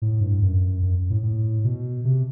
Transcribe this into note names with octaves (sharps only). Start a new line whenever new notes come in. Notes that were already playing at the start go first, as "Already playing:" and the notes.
A2
G2
F#2
F#2
A2
A2
B2
C3